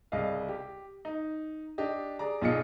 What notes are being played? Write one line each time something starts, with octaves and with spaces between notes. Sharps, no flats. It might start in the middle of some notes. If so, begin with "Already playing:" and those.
C2 C#3 D#5 F5
G4
D#4
D4 G4 D#5
G#4 D5 A#5
B1 A#2 F4 G#4 D#5 C#7